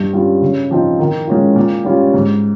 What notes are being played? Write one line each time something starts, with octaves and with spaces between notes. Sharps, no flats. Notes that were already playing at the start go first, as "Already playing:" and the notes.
Already playing: G2
G3 C#4 F4
C#3
F3 C4 D#4
D#3
G#3 C#4 F4
A#2
G3 C#4 F4
G#2